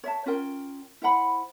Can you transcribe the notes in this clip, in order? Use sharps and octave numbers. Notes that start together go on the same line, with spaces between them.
C#5 E5 A5
C#4 F4 A#4 G5
E4 C5 F#5 B5